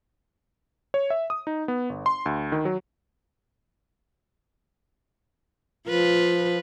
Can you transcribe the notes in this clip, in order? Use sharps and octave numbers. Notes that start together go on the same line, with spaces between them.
C#5
E5
D#6
D#4
B3
G1
C6
D2
D#3
F#3
F3 F4 B4